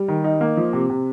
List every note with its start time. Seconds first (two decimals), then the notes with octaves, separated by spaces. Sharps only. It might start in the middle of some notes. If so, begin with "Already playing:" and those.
Already playing: G3
0.08 D#3
0.24 D#4
0.41 A#3
0.57 F3
0.73 C3
0.90 C3